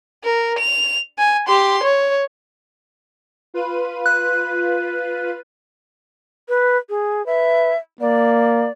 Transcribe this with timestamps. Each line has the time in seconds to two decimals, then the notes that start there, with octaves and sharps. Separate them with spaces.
0.24 A#4
0.58 F7
1.18 G#5
1.48 G4 C6
1.83 C#5
3.54 F4 B4 D#7
4.06 F#6
6.49 B4
6.89 G#4
7.26 B4 E5
8.01 A#3 D5